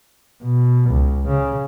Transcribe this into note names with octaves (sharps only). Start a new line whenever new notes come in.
B2
C#2
C#3